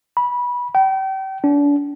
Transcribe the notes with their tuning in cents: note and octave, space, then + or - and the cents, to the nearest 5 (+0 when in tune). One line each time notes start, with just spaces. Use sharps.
B5 -20
G5 -35
D4 -35